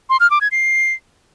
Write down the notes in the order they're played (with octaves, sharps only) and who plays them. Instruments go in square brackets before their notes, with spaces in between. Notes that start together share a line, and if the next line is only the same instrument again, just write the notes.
[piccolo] C6
F6
D6
G#6
C7